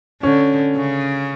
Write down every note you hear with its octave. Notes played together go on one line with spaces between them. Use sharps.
D3 C#4
C#3